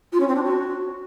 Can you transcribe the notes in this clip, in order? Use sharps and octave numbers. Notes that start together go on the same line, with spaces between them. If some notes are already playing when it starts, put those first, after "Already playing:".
F4
C#4
C4
D4
F#4